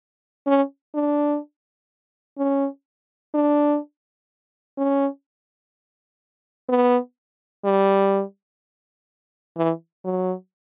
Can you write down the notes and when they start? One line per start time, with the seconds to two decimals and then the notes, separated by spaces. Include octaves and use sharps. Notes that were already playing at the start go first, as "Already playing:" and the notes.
0.47 C#4
0.95 D4
2.38 C#4
3.34 D4
4.78 C#4
6.69 B3
7.65 G3
9.57 E3
10.05 F#3